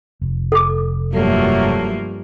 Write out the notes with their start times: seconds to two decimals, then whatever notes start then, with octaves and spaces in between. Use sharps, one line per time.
0.21 F1
0.52 A4 D6
1.14 G2 F3 F#3 A3 A#3